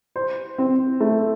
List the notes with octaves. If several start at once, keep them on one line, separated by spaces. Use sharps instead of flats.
C5
C4
A3